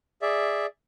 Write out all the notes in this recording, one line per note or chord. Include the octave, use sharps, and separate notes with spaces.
G#4 D5 E5